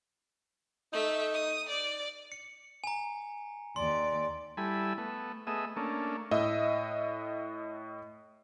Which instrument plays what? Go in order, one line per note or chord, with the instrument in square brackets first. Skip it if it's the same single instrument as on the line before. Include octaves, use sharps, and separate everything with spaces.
[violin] A3 E5 [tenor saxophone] D#4
[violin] D#6
D5
[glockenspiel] C#7
G#5 A#5
[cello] D#2 D5 [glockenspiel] C6
[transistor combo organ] G3 E4 A4 G#5 B5
A3 B3
A3 B3 G#4 D#5 E5
A3 A#3 C#4 D4
[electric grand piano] A2 D#5 E5